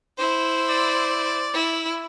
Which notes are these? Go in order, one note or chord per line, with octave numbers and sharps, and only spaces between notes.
E4 C5
D5
E4